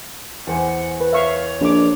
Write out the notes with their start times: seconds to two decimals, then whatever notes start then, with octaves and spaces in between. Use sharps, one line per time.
0.47 E2 C5 F#5 G#5
1.00 B4
1.13 C#5 E5 F5 C#6
1.61 A#1 D4 D6